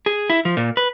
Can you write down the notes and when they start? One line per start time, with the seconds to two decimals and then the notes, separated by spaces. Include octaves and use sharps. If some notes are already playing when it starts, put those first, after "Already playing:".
0.06 G#4
0.30 E4
0.45 F3
0.57 A#2
0.77 B4